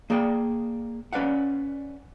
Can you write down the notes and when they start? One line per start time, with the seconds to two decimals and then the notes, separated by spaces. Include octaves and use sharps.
0.10 A#3 G#4 D5 G5
1.13 C#4 B4 D5 F5 F#5